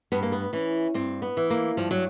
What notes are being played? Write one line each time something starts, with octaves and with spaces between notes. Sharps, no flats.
G2 B3
A#3
B3
E3 C#4
G2 C4
B3
E3
A#3
G2 F3
F#3